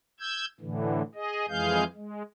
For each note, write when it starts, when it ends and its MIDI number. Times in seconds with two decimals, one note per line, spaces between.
0.20 0.45 88
0.20 0.45 91
0.20 0.45 92
0.60 1.02 45
0.60 1.02 50
0.60 1.02 52
1.15 1.46 68
1.15 1.46 75
1.49 1.84 41
1.49 1.84 52
1.49 1.84 56
1.49 1.84 68
1.49 1.84 77
1.49 1.84 91
1.95 2.23 56